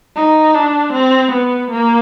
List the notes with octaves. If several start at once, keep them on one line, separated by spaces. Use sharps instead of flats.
D#4
D4
C4
B3
A#3